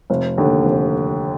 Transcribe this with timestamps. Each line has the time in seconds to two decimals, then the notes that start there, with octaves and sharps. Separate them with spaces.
0.10 F1
0.38 D#2 D3
0.65 F1